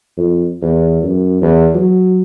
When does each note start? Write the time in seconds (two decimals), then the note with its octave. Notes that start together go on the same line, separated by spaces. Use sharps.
0.17 F2
0.62 E2
1.03 F#2
1.42 E2
1.74 F#3